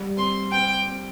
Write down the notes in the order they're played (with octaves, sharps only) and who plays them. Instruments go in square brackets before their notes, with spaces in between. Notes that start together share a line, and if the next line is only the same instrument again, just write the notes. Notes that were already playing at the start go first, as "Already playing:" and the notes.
Already playing: [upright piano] G3
[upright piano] C4 [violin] C6
[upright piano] C4 [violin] G5
[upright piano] C4